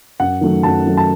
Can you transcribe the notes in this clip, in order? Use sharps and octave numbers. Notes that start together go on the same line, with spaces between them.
F#2 F#5
D#3 F#3 A3
F#2 A5
D#3 F#3 A3
A5